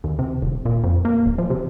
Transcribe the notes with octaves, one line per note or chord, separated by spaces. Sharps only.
D#2
C3
D#1
A#2
F2
A#3
D1
F3
C3